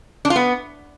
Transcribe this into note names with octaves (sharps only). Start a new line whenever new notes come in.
D4
F4
B3